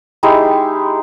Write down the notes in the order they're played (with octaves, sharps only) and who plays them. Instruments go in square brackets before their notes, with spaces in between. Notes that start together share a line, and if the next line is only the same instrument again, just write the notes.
[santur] G#3 D#4 E4 G4